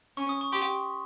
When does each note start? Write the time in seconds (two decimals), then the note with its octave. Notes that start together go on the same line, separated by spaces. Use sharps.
0.17 C#4 C#6
0.29 D#6
0.41 C#6
0.52 G4 C6